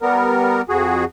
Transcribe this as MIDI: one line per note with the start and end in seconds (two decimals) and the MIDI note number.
0.02 0.62 55
0.02 0.62 59
0.02 0.62 70
0.69 1.05 41
0.69 1.05 66
0.69 1.05 68